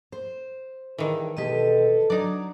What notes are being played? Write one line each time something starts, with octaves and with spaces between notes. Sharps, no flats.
C5
G2 D#3 E3 E4 G#4
B2 G#3 G4 A4 B4 D#5
F#3 D4 D#4 D5